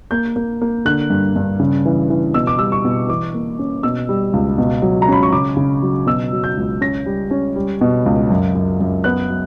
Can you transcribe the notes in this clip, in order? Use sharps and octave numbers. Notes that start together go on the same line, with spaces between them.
A#3 G6
A#3
A#3
D3 F#6
G2
G2
C#3
E3
E3
B2 E6
D6
G3 E6
C#6
B2
E3 D6
A#3
C#4
B2 E6
G3
C#2
B2
F#3
A#5
C#4 B5
C#6
C#3 D6
C#3
F#3
B2 E6
F#3
G6
C#2
C#4 A#6
G3
C#4
G3
B2
C#2
F#2
F#2
F#2
B3 F#6
F#3